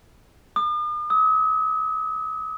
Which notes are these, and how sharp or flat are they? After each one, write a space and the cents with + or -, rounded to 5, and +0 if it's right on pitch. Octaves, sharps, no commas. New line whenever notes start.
D#6 -45
D#6 +45